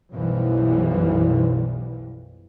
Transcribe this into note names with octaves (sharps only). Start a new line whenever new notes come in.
B1 F#2 B2 E3 F3 G3